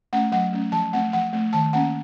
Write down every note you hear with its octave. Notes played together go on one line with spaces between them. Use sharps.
A3 C#4 F#5
F#3 F#5
A3 C#4
F3 A5
A3 C4 F#5
F3 F#5
A3 C4
D#3 A5
A#3 C#4 F#5